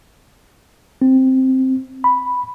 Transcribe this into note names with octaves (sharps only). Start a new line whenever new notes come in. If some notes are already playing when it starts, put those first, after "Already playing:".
C4
B5